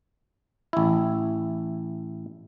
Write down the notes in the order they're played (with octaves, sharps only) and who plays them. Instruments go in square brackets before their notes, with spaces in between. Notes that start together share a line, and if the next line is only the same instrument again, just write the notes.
[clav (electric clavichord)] A1 E4